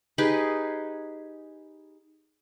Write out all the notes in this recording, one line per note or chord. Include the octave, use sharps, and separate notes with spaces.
D#4 G4 G#4 B4